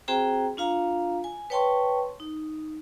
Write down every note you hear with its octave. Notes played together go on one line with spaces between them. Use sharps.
C4 F#4 G#4 C5 G5 A#5
D4 F4 F5 A#5
G#5
B4 C#5 G5 A5 C6 C#6
D#4